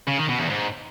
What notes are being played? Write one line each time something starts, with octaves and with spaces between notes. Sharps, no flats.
C#3
D#3
B2
E2
G#2